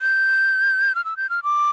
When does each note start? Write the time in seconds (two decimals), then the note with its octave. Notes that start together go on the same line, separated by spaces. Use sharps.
0.01 G6
0.95 F6
1.05 E6
1.17 G6
1.30 F6
1.43 D6